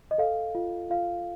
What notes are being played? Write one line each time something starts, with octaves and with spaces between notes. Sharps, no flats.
D#5
A4 F5
F4
F4 F5